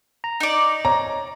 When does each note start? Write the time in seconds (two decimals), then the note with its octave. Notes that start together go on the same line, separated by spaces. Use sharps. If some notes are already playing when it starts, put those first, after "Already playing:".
0.24 A#5
0.40 D#4 D5
0.85 C#5 A#5